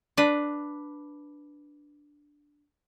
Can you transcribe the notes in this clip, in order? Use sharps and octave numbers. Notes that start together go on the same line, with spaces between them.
D4 B4